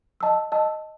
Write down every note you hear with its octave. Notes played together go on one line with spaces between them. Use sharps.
D#5 A5 E6
D#5 A5 E6